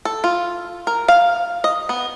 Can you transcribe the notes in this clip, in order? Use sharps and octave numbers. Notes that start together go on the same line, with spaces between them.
A4
F4
A#4
F5
D#5
B3